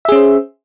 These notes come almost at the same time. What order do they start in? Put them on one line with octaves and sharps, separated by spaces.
E5 G#4 C#4 C5